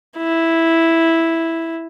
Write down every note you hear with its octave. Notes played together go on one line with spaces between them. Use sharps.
E4